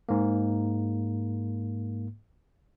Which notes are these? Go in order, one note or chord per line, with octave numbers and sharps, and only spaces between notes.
G#2 A#3